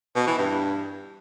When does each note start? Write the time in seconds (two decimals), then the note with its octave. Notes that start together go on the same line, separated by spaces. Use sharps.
0.16 B2
0.27 E3
0.38 G2